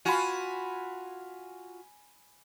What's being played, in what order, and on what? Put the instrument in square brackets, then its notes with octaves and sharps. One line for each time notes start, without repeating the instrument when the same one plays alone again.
[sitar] F4 F#4 [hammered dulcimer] G#5 B5